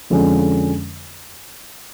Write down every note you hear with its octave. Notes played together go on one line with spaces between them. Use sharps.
F2 D3 F3 G#3 C#4